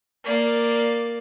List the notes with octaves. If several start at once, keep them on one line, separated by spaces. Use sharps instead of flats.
A#3 D5